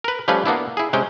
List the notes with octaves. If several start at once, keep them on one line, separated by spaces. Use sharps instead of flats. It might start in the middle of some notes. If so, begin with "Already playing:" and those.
A#4 B4
F3 G3 A3 C#4 F4 B4
A#3 B3 D4 E4
E4 G#4
C3 G#3 C#4 G5